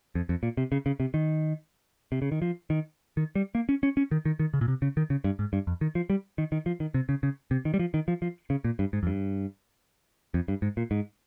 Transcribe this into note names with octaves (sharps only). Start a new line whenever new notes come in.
F2
F2
A#2
C3
C#3
C#3
C3
D#3
C3
C#3
D#3
F3
D#3
D#3
G3
A#3
C#4
C#4
C#4
D#3
D#3
D#3
C#3
A#2
C3
C#3
D#3
C#3
G2
G#2
G2
F2
D#3
F3
G3
D#3
D#3
F3
D#3
C3
C#3
C#3
C3
D#3
G3
F3
D#3
F3
F3
C#3
A#2
G2
G#2
F2
G2
F2
G2
G#2
A#2
G#2